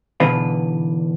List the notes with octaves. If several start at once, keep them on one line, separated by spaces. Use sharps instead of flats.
E2 B2 D3 B4 F5